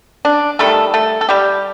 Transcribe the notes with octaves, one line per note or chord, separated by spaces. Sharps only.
D4
D#3 G3 A3 A4
A3 A4
A4
G3 G4